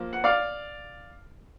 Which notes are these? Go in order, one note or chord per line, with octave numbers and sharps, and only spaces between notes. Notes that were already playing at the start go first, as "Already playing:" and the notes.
Already playing: F3 A#3
F#5
D5 F5